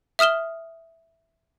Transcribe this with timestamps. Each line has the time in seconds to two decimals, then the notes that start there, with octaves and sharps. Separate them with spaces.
0.19 E5 D#6 F6 E7 G7